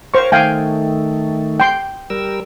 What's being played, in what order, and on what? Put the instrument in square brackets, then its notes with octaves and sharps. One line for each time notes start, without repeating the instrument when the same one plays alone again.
[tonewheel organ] A#4 C#5 F5 [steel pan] C5 C#6
[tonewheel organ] D#3 A3 [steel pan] F5 G5 G#5
[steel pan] G5 C6
[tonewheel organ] G3 A#4 E6